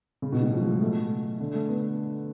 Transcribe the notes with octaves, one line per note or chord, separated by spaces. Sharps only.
C#3
B2
A2
F3
F#3
G#3
A3
D3
A3
B3